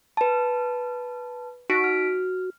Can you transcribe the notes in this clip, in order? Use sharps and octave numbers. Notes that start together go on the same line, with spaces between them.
B4 A5
D#4 F#4 B6 D7
F6